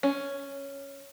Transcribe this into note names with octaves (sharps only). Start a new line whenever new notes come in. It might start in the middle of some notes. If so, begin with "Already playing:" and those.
C#4